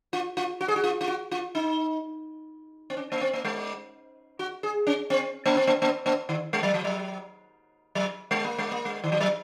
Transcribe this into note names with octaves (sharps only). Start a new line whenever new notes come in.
F4
F4
F#4
G#4
F#4
F4
F4
F#4
F4
D#4
C4
C#4
A#3
C4
A#3
G#3
F#4
G#4
C#4
C4
A#3
C4
A#3
A#3
A#3
D#3
G#3
F#3
F3
F#3
F#3
G#3
A#3
G#3
A#3
G#3
D#3
F3
F#3